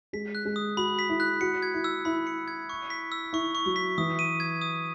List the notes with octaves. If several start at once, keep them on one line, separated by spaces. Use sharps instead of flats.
G#3 B6
F#6
G#3
D#6
F#4 B5
B6
E4
F#6
F#4 C#7
G#6
E4
E6
E4 B5
C#7
G#6
C#6
B6
E6
E4 C#6
C#6
F#3
B6
E3 D#6
D#7
G#6
D#6